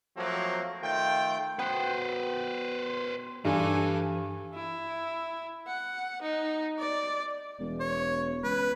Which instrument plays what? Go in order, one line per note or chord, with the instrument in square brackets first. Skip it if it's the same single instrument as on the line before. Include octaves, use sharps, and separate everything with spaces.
[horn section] F3 F#3 A3 A#3 C4
D#3 A3 F4 G5
[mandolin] B3 F#4 G5 [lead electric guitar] B4 C5
[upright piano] G2 [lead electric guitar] E3 [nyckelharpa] A4 G#5
[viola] E4
F#5
D#4
D5
[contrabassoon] E1
[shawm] C#5
[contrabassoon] C#2 [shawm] B4